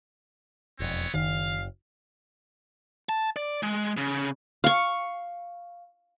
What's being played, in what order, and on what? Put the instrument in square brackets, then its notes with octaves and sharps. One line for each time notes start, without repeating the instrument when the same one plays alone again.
[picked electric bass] E1 F2 [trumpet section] B3 C4 C#5
[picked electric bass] F#1 [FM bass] D#3 [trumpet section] F5
[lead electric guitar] A5
D5
G#3
C#3
[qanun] F5 C#6